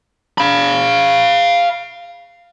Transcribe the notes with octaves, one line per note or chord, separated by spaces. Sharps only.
F5 B5